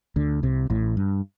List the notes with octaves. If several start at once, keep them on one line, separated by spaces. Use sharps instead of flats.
D2 D3
C2 C3
A1 A2
G2